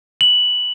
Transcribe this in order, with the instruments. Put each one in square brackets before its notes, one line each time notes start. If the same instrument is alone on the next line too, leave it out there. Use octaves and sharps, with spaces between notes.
[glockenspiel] F#7